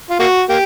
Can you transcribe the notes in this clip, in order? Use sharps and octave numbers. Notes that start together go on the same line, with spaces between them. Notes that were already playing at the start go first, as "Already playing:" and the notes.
F4
A#3 F#4
A#3 G4